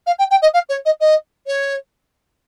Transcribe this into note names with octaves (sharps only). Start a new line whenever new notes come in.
F5
G5
G5
D#5
F5
C#5
D#5
D#5
C#5